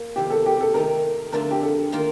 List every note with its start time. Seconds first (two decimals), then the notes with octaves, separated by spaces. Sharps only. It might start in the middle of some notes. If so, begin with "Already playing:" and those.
Already playing: A#3
0.16 F2 C3 D#3 G4
0.30 A4
0.46 G4
0.61 A4
0.74 D#3 A3 D#4 A#4
1.32 F2 D3 A3 D4 F4 A#4
1.51 G4
1.63 A4
1.92 D#3 A#3 F4